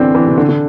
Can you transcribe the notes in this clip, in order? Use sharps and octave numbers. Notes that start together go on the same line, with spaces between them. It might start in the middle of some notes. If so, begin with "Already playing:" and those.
Already playing: D3 E3 C4 D4
E3
C3
D3
D3